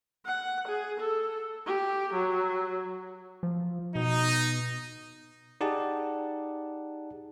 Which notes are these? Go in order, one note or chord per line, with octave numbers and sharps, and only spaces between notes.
F#5
G#4
A4
G4
F#3
F3
B2 D#4
D#4 G4 G#4 D5 F#5 A5